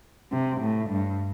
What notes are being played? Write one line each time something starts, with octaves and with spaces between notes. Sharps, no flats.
C3
A2
G2